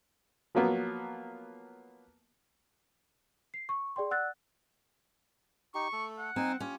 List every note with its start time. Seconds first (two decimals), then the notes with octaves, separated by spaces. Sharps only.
0.55 F3 F#3 A#3 B3
3.54 C7
3.69 C#6
3.96 G#4 D5 G5 C6
4.10 D5 F#5 E6 F#6 A6
5.74 D#4 G4 C#6
5.93 A3 A4
6.19 F#5
6.36 C4 D#4 G#5
6.60 C#4 F4 G4